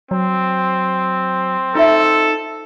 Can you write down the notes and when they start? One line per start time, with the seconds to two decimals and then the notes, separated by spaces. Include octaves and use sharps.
0.11 F#3 C4
1.75 D#4 F4 A4 D5 E5